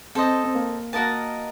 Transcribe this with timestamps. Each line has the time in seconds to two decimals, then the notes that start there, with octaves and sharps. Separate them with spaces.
0.15 C4 A4 C5 D#5
0.44 C4
0.54 A#3
0.93 A#3 F#4 A#4 D#5 A5